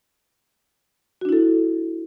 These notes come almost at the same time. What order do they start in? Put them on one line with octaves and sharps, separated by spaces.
F#4 D4 E4 A4